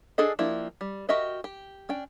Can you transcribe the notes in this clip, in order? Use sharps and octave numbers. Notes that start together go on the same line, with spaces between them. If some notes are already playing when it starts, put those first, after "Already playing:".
D4 G#4 A4 D#5
F3 A#3 D4 E4 G4
G3
F#4 G4 A#4 D#5 E5
G4
C#4 D4 G5